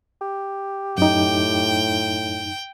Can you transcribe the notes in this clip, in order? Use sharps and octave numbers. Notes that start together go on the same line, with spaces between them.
G4
F#2 A2 D#4 G5